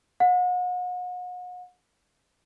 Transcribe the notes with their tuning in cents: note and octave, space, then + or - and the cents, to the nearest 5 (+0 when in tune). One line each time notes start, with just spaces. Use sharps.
F#5 -40